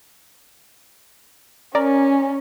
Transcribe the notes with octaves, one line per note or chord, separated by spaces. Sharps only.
C#4 A#4 D5